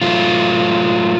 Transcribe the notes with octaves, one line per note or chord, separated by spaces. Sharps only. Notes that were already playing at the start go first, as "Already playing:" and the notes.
A2 F#3 A3 F4